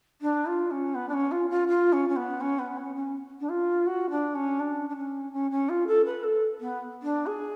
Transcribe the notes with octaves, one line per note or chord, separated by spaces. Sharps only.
D4
F4
C#4
B3
D4
C#4
F4
F4
F4
C#4
C#4
B3
C#4
B3
C#4
C#4
D4
F4
F#4
D4
C#4
D4
D4
C#4
C#4
C#4
F4
A4
B4
A4
B3
D4
G#4